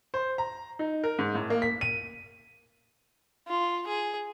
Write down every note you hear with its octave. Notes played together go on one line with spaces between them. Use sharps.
C5
A#5
D#4
A#4
G#2
A2
A#3
B6
D#7
F4
G#4